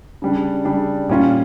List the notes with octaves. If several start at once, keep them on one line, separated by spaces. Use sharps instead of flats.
C#3 G3 D4
C#3 G3 D4
A#2 G3 C#4 F4